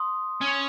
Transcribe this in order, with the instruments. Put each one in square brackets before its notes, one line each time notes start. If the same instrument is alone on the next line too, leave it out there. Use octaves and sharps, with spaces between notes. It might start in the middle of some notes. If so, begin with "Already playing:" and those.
Already playing: [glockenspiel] C6 D#6
[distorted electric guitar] C#4